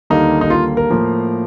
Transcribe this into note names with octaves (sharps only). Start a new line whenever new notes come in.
D#2 D3 G3 A#3 D#4
D#4
F4
A#4
A2 F3 A#3